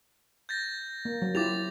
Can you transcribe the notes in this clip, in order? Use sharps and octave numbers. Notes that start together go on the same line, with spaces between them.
G6 A6 A#6
A#3
F#3
E4 F4 G4 D6 A6 F7